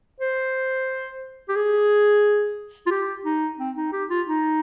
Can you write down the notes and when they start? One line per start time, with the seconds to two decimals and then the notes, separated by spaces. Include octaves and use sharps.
0.20 C5
1.49 G4
1.56 G#4
2.86 F4
2.91 G4
3.25 D#4
3.59 C4
3.76 D#4
3.93 G4
4.10 F4
4.28 D#4